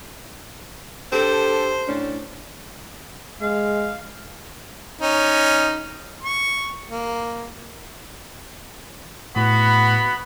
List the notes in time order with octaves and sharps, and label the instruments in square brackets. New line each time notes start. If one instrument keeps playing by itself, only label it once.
[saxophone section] D4 G4 A4 [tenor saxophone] C5
[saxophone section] A2 C#4 D4
[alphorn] G#3 [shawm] F5
[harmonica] C#4 D#4
C#6
A#3
[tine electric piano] A2 [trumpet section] B3 F#4 B5